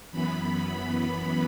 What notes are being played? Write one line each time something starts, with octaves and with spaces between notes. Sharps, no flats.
F#2 E3 B3 B5